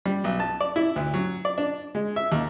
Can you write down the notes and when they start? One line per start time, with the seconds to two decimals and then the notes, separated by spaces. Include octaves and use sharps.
0.06 G3
0.24 B1
0.40 A5
0.61 D5
0.76 E4
0.96 D2
1.14 F#3
1.45 D5
1.58 D4
1.95 G#3
2.16 E5
2.32 D#2